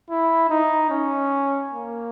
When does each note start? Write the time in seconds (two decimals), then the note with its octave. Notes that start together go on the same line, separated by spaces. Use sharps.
0.10 E4
0.50 D#4
0.91 C#4
1.73 A#3